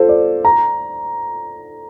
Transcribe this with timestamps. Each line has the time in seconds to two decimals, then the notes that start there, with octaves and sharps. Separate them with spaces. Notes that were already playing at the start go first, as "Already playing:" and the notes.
Already playing: F4 A4 C5
0.09 D5
0.45 A#5